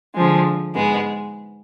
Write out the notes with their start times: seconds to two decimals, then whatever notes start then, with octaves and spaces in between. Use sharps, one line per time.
0.15 D3 F3 G#3
0.75 G#2 G#3 B3